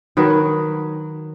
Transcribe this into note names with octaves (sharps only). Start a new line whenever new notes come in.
D#3 F#3 B4